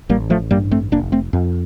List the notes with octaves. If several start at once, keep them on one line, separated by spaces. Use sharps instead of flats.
A1 G3 A#3
F3 A3
G2 G3 A#3
A3 C4
F1 A#3 D4
A3 C4
F2